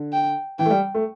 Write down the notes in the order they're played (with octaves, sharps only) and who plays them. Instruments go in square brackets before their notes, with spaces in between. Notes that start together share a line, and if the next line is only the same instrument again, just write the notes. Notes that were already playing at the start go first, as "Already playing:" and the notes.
Already playing: [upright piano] D3
[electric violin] G5
[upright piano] E3 [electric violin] G5
[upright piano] A3
G3
A3